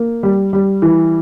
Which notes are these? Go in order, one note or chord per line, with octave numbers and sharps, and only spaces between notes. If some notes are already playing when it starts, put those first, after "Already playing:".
Already playing: A#3
G3
G3
E3